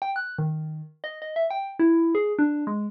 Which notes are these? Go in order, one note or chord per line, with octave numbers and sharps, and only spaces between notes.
G5
F#6
D#3
D#5
D#5
E5
G5
E4
G#4
D4
G#3